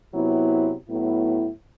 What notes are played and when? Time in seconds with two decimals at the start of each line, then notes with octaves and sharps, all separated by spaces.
0.13 C3 F#3 B3 E4
0.88 A2 F#3 B3 E4